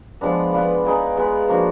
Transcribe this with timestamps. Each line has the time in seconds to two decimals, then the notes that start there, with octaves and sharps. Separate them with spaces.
0.21 F3 G#3 B3 D4
0.53 B3 F4 B4 D5
0.85 B3 D#4 G#4 D5
1.17 G#3 B3 F4
1.48 F3 A#3 D4 F#4